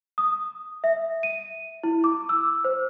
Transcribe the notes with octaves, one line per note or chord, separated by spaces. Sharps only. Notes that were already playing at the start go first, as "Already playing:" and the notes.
D#6
E5
D#7
E4
D6
E6
C5